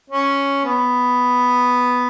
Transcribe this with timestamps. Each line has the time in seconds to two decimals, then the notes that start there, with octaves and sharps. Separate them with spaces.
0.10 C#4
0.64 B3